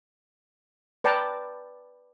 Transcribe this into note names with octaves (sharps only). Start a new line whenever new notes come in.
B4 D5 G5 A5 A#5